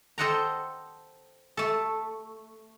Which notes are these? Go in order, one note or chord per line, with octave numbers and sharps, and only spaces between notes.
A4 C5 D#5 F#5 G5 A#5
A3 A4